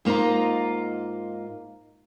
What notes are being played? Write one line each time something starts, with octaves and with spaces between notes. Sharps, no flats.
G#2 A#3 F4 D#5 A#5